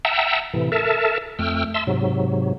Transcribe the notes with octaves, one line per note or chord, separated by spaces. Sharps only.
E5 F#5 G5 A5 A#5 E6
A2 C3 E3
A4 A#4 E5 A5
F2 A3 G5 E6 F6
E5 A5 C6 E6
G#2 C3 F#3